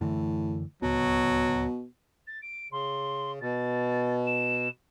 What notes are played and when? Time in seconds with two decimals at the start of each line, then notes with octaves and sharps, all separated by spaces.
0.01 F#2 A2 D3 E3
0.82 D1 C#2 B2 F#3
2.27 A6
2.42 D7
2.72 C#3 C6
3.41 B2 A6
4.26 E7